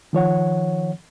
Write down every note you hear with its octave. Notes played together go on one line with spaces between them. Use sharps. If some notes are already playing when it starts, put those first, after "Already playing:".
D#3 F3 C#5 F#5